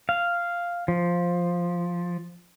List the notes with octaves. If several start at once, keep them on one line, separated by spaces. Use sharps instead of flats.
F5
F3